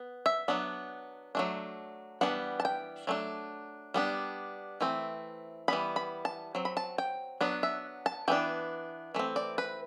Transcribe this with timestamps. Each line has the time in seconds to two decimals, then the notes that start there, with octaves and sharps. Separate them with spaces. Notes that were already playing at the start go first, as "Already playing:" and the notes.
Already playing: B3
0.26 E5
0.48 F#3 B3 D4
1.35 F#3 A3 D4
2.21 E3 G3 B3 D4 F#5
2.60 A5
2.65 G5
3.07 F#3 A3 D4
3.94 G3 B3 D4
4.81 E3 A3 C4
5.68 E3 G3 B3 B5
5.96 B5
6.25 A5
6.55 F#3 C4
6.65 B5
6.77 A5
6.98 G5
7.41 F#3 B3 D4
7.63 E5
8.06 A5
8.28 E3 B3 D4 G5
9.15 E3 A3 C4
9.36 D5
9.58 B4